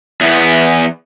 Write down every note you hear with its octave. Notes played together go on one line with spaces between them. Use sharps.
E2 B3